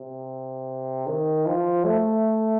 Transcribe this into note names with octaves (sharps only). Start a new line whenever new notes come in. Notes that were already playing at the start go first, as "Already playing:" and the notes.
Already playing: C3
D#3
F3
A3